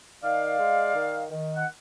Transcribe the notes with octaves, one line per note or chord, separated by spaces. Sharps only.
D#3 D5 F5
G#3
D#3
D#3
F#5